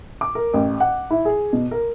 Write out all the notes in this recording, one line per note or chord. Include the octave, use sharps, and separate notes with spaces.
D6
A#4
A1
F#5
E4
G#4
B2
A#4